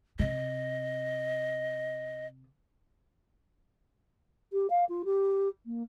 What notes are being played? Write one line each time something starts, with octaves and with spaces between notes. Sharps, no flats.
C3 D#5
G4
F5
F4
G4
A#3